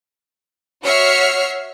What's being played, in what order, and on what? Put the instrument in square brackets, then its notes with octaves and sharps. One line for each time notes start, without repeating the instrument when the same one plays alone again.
[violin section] F#4 C#5 E5 F6 C7 C#7